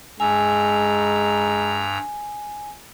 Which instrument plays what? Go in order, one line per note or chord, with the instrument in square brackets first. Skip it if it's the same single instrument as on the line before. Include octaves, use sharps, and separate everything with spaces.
[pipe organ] G2 A#5 E6 [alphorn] G#3 [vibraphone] G#5